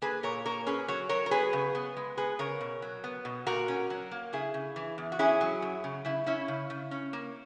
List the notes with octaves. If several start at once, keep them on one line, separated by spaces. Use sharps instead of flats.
A#3 G#4 B4
A#2 A#4 C#5
A#3 A#4 C#5
C#4 G#4 B4
F#3 C#5
F#3 A#4 C#5
A#4
B3 G#4 B4
C#3
B3
G#3
B3 G#4 B4
C#3 A#4 C#5
B2
F#3
B3
B2
A#2 F#4 A#4
C#4
F#3
A#3
C#3 E4 G#4
C#3
E3
E2
F#4
C#4 E4 G#4
F#3
F#2
C#3
C#3 E4
C#4 E4
C#3
C#3
C#4
A#3